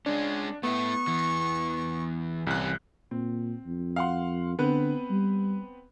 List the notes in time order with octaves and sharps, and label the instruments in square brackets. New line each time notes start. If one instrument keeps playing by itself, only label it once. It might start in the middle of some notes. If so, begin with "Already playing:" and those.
[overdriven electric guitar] G#3 C#4 [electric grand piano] D4
[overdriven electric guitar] A3 E4 [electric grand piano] B3 [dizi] C#6
[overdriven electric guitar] E2 E3
[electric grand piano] C2 F#6 [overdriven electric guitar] E3 C#4
[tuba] A#2 [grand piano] C4
[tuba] F2
[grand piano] F5 F#5 C6
[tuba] D3 [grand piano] B3 C4 B4
[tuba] G3